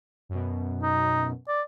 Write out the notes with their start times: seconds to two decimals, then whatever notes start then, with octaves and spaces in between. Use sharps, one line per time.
0.29 F#2 B2
0.82 D#4
1.48 D5